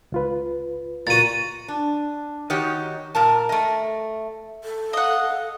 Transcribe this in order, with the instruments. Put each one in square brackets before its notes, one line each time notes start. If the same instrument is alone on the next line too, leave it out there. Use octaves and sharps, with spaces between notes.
[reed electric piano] C#2 F4 B4
[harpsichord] A#2 F#4 [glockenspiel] A6 D#7
[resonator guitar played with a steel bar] D4
D#3 D#4 F#4 G4 C#5
A#2 A#4 A5
A3 D#5
[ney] A4
[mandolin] D#5 F#5 [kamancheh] F5